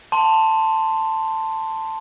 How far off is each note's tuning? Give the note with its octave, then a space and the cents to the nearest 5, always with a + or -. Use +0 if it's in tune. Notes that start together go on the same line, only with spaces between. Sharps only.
A5 +10 C6 +0